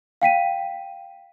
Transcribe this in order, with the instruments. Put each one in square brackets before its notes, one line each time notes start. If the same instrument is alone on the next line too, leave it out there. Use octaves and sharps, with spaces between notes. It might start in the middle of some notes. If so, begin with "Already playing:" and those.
[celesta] F5 G5 B6 D#7